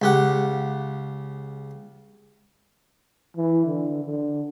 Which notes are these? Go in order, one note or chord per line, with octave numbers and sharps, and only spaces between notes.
C#2 G4 F#5
E3
D3
D3